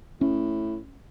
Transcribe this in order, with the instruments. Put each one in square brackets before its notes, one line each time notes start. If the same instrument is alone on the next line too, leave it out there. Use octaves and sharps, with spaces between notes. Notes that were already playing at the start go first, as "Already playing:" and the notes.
[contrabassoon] A2 [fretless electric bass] C#4